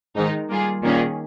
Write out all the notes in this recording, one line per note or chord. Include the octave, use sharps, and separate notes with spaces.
G#2 D#3 G#3 D#4
G3 A#3 F4 G#4
A#2 D#3 A#3 C#4 G#4